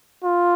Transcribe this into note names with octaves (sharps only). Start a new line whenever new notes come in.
F4